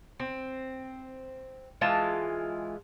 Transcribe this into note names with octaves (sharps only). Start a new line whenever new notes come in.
C4
E3 G#3 F4 A5